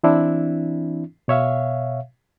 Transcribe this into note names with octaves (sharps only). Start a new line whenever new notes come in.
E3 C4 D4 E4
B2 C#5 E5 F5